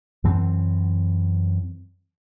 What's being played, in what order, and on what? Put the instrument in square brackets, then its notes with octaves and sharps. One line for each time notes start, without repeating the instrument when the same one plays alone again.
[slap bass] F#2 E3 C4